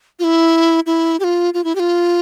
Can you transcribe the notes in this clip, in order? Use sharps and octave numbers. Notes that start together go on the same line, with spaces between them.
F4
E4
E4
G4
F4
F4
E4
G4
F4